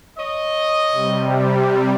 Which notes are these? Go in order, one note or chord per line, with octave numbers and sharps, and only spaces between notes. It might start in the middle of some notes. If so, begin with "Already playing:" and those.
C#5 D#5
C3 G3